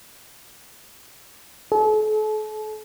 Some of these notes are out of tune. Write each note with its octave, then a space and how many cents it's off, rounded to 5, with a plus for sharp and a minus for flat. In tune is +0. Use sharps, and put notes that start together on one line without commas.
A4 -40